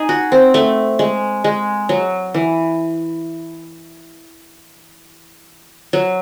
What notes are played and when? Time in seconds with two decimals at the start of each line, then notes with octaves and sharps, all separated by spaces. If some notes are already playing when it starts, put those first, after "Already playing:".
Already playing: D#4 G#4
0.09 F#4
0.32 C4
0.54 A3
0.99 G#3
1.44 G#3
1.89 F#3
2.34 E3
5.93 F#3